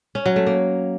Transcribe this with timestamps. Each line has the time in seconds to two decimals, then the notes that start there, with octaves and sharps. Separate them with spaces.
0.15 C#4
0.26 F#3
0.36 A3
0.47 A#3